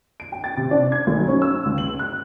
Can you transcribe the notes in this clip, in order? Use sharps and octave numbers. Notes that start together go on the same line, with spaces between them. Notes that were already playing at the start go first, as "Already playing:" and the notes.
D7
G5
A6
C3
D4
G#6
B1
C#4
E6
C#2
F#7
F#6